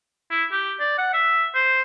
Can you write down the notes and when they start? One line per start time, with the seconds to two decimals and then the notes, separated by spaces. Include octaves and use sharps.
0.31 E4
0.52 G4
0.80 D5
0.98 F#5
1.14 E5
1.54 C5